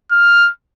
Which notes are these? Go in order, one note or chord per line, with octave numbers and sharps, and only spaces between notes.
F6